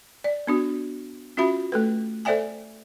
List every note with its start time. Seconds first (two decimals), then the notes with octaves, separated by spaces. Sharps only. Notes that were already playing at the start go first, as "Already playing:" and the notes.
0.24 D5
0.47 B3 D4 F#4
1.37 C#4 F4 F#4 E5 B5
1.72 A3 A4 B4
2.25 A4 C5 D5 E5 G5 G#5